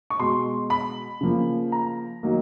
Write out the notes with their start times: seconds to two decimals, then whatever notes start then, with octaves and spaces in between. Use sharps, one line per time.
0.10 C#6
0.19 B2 G#3 C6
0.70 B5
1.21 C#3 F3 A#3
1.72 A#5
2.23 D#3 F#3 A#3